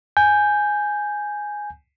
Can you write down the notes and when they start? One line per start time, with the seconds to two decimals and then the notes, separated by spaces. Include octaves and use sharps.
0.17 G#5 G6